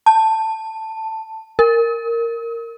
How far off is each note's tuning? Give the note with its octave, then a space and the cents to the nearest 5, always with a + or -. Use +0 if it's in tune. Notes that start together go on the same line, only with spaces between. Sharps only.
A5 +10
A#4 -10